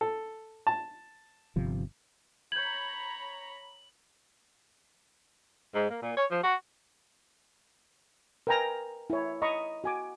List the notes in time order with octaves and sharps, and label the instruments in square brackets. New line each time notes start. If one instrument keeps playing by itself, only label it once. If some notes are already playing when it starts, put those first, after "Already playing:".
[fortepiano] A4
A5
[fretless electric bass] G1 C3 F3
[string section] C#5 A#5 B5 [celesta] G6 G#6 [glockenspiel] F#7
[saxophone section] G#2
A#3
A#2
C#5
F3
F#4
[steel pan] A#4 B4 G5 G#5 A#5
E4 C#5
D#5 A#5 B5 C#6
F#4 G#5 D6